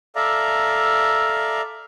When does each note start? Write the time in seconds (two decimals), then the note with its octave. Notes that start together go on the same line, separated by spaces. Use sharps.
0.16 A4 D5 E5 F5 A#5